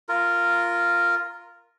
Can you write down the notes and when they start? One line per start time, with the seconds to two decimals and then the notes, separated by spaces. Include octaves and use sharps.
0.09 F4 A#4